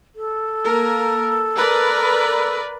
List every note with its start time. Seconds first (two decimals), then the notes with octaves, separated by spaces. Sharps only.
0.15 A4
0.64 A#3 A#4
1.56 A#4 B4 D5